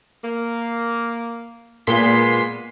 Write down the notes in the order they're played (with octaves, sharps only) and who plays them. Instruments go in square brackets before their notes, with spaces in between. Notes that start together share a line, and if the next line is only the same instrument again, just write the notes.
[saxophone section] A#3
[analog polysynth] A#2 C6 B6 [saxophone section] G#3 A#3 B3